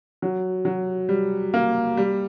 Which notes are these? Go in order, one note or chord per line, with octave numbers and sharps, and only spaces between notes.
F#3
F#3
G3
A#3
G3